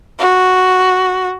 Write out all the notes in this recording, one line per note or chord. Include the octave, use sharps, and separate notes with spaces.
F#4